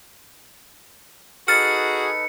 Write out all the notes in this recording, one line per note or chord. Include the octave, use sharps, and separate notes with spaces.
D#4 F#4 G#4 A4 B4 F6 A6 C#7